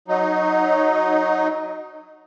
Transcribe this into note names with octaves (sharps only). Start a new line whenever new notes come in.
F#3 D#4